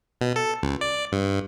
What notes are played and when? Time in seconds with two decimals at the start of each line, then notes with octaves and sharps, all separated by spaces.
0.21 B2
0.36 A4
0.63 C#2
0.81 D5
1.12 G2